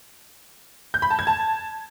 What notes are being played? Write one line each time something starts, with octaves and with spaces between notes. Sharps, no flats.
G6
B5
A5
G#6
A5